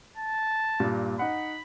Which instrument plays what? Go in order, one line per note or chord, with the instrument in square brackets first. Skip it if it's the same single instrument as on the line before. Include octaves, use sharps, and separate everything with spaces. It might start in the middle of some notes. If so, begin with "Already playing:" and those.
[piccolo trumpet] A5
[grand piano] G2 A#2
[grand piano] D#4 F#5 [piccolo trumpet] B5